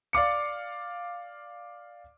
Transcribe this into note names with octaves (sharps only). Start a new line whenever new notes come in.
D5 F5 D6 C#7